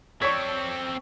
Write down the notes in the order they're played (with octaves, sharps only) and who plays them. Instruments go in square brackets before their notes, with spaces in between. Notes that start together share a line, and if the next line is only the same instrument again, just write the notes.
[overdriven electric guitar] C4 A4 [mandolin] C#5 D5 [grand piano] C#6 B6